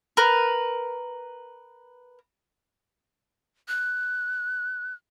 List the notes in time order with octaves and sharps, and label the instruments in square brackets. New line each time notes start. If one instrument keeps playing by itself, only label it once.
[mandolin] A#4 B4
[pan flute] F#6